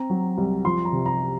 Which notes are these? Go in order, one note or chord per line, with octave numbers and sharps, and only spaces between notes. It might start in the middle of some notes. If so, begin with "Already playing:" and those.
Already playing: C4 A#5
F#3
C2
F3 C6
A#5
C3
A#5